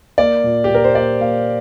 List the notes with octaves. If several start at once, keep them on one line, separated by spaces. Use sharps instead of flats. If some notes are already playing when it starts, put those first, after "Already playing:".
A#3 D5
A#2
G4
A#2 A#4
C5
A#3 D5
A#3 F5